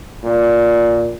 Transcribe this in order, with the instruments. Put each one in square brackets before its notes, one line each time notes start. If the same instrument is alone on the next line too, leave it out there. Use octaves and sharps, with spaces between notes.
[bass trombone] A#2